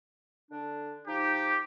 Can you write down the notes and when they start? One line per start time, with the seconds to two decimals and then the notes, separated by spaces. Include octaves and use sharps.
0.51 D3 D4
1.08 F3 D#4 G4